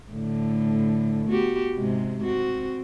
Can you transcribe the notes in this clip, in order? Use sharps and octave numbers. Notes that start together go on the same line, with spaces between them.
A2 D3
B3 F#4 G4
G#2 C3 G#3
C4 F#4